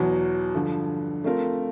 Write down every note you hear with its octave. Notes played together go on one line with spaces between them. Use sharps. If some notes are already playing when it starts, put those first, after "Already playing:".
Already playing: E2 B2 F#3
G2 D3 F3
A3 C4 F4 A#4